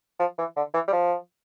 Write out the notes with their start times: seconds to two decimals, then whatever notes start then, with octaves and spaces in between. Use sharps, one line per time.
0.20 F3
0.39 E3
0.57 D3
0.74 E3
0.88 G3
0.92 F3